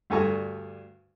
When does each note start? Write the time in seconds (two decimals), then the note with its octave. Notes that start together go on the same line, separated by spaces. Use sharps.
0.10 D2 G2 A4 G#5 A#5 C#6